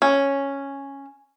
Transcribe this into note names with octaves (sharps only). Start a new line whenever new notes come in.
C#4